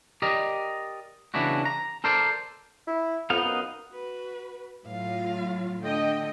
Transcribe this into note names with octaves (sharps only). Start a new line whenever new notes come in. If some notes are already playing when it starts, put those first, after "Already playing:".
G4 A#4 D5 D#5
C#3 E3 B3 D4 E4 F#4
A#5
A4 A#4 C5 D5
E4
F2 B3 D#4 F5
F#2
F#4 B4
A2 F#3 F4 F5
D3 A3 A4 D#5 G5